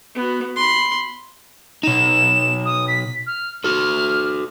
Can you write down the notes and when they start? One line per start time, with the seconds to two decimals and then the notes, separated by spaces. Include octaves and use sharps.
0.15 B3 F#4
0.56 B5 C6
1.83 B2 D#4 E7
2.65 D#6
2.88 B6
3.27 F6
3.64 F#4 A4 F6